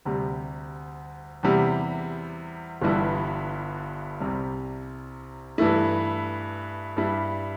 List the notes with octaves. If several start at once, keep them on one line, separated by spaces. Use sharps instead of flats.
D2 C3 G3
E2 C3 G3 E4
G1 G2 E3 G3 E4
C2 C3 G3
G2 E3 A3 E4
G2 G3 E4